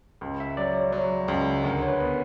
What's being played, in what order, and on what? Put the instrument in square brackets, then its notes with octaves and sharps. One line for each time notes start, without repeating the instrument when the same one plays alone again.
[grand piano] C#2
[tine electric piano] E5
[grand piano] F#3 [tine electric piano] D5
[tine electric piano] C#5
[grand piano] F#3
C#2
[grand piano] D2 [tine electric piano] A#4
[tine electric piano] C#5
B4
[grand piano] B3